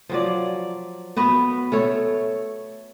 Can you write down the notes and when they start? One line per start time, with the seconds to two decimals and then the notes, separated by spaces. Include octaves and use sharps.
0.09 F3 F#3 D5
1.16 B3 F#4 B4
1.72 A3 A4 C#5